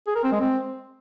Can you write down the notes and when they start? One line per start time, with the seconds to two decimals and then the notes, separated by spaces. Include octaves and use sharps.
0.07 G#4
0.15 A#4
0.24 C4
0.32 G#3
0.40 C4